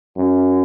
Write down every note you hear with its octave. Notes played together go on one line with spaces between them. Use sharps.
F#2